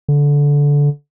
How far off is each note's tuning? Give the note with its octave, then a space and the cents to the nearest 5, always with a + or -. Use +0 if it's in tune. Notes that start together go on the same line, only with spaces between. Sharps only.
D3 -20